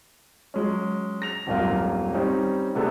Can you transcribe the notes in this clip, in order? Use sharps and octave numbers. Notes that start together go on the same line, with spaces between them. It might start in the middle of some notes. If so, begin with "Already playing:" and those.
F#3 G#3 C#4
A#6 F7
D#1 G#1 F#2 A#3 F4
G3 C4 C#4 D#4
C3 A3 B3 D4 G#4 A4